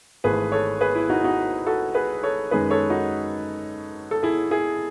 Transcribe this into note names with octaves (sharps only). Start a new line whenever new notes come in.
G#1 G#2 E3 A3 G#4 B4
A4 C#5
G#4 B4
E4
D#4 F#4
D#4 F#4
F#4 A4
G#4 B4
A4 C#5
F#2 D#3 G#3 D#4 G#4 B4
A4 C#5
D#4 F#4
A4
E4 G#4
E4 G#4